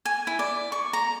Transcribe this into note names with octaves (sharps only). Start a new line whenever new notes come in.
G#5
E4
D5
C#6
A#5